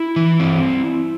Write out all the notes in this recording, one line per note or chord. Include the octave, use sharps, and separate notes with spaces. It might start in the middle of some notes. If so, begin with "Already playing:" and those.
Already playing: E4
E3
C4